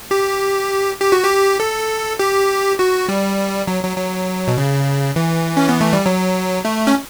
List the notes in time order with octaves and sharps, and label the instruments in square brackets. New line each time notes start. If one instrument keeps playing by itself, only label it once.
[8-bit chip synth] G4
G4
F#4
G4
A4
G4
F#4
G3
F#3
F#3
F#3
B2
C#3
E3
C#4
B3
A3
G3
F#3
A3
C#4